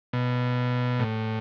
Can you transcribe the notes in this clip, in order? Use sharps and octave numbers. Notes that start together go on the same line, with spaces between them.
B2
A2